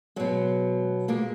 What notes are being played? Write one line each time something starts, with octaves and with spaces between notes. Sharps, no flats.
B2 F#3 G#3
A#2 G#3 A#3